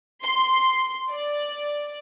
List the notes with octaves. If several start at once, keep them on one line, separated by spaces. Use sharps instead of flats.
C6
D5